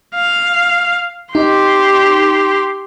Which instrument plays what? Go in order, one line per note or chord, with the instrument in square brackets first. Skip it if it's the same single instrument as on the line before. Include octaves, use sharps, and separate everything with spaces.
[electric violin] F5
[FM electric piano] D#4 [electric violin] G4 C6